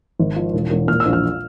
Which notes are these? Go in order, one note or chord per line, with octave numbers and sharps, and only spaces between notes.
G#1
F3
E1
E1
A#2 F6
E6
A#1
F6